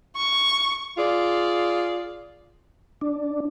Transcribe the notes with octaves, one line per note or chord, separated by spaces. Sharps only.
C#6
F4 G#4 D5
D4